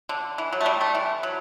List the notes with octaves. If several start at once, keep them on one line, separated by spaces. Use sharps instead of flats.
D3
E3
F#3
A3
G3
A3
E3
F#3